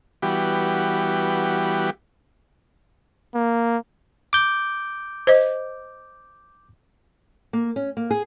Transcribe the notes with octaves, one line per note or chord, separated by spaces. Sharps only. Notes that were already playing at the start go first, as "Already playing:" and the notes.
E3 G3 B3 F#4 G4
A#3
D6 G6
C5 D#5
A#3
C#4
A#3
G#4